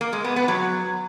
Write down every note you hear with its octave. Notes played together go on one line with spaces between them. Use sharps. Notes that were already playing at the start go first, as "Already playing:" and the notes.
A#3
G#3
B3
B3
F#3